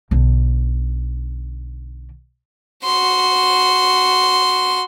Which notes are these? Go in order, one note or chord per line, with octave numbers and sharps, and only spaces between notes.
B1 D3
F#4 C6